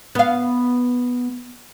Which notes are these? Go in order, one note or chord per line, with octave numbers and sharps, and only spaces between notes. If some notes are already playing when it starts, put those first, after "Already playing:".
B3 F5